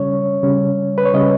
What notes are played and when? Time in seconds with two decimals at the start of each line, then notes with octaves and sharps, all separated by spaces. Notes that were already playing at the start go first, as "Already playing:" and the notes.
Already playing: C#3 G3 C#4 C#5
0.43 C#3 G3 C#4
0.98 B4
1.05 C#5
1.14 C#3 G3 C#4 D#5